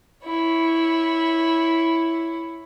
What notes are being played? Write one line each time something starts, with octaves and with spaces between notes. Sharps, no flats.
E4 C#5